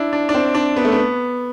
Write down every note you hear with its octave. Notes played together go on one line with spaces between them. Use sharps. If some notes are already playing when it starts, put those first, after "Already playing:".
Already playing: D4 E4
D4
D4
C4
D4
B3
A3
B3